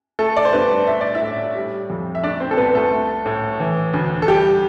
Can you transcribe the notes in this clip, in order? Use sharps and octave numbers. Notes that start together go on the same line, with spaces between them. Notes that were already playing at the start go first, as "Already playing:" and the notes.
A3 A4
D5
C5
G2 B3 B4
A3 E5
D5
E4 E5
A2
G3
F2
E5
A3 D4 D5
C4 C5
A4
C2 B3 B4
A3 A4
A3
A2
E3
D2
A4
G3 G4